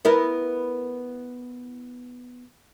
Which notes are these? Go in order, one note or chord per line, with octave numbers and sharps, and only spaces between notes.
B3 E4 A#4